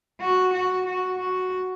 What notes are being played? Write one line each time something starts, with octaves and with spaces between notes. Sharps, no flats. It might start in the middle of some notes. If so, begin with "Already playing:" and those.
F#4
F#4
F#4
F#4